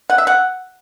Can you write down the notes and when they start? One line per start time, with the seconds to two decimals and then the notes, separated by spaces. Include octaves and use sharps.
0.10 F#5
0.18 E5
0.27 F#5